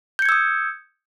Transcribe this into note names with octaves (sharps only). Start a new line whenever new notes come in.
D#6 E6 G6 G#6 C#7